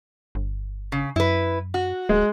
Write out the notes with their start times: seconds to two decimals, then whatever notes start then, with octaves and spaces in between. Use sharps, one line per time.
0.35 G1
0.92 C#3
1.16 F#2 E4 B4
1.74 F#4
2.09 D1 G#3